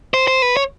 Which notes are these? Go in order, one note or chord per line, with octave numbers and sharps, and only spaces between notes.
C5
C5
B4
C#5